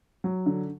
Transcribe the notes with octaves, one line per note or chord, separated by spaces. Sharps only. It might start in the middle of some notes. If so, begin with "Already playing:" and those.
F#3
D3